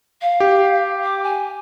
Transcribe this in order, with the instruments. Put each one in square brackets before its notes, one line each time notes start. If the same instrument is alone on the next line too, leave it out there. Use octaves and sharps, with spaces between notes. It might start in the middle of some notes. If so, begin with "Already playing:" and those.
[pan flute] F5
[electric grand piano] G4
[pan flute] D6
G#5